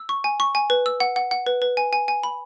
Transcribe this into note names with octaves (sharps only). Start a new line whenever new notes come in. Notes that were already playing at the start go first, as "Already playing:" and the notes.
Already playing: E6
C#6
G#5
C#6
G#5
B4
E6
F#5
F#5
F#5
B4
B4
G#5
G#5
G#5
B5